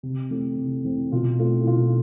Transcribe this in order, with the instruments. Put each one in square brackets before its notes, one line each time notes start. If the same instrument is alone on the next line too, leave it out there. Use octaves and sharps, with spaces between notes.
[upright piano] C3
E3 A3 C4
C3
E3 A3 C4
B2 F4
A3 C4 F4
E4
B2 F4